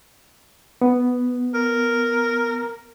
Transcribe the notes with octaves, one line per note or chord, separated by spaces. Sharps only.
B3
A#4